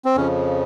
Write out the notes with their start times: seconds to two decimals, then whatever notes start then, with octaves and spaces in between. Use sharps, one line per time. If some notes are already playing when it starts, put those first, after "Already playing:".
0.05 C4
0.16 F2 C#3 F3 C#4